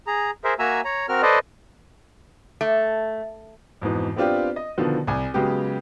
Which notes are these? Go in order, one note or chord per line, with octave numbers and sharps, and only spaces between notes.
G#4 A#5
G#4 A#4 C5 E5
A#3 F#4 E5 G#5 A#5 E6
C#5 A#5
C4 F#4 A#4 F6
A4 B4 C5 D5 D#5
A3
F2 G#2 B2 E3
B3 C4 D4 F4 G4
D#5
B2 D3 D#3 F3 B3
C2 G#5
C#3 F#3 G#3 B3 G4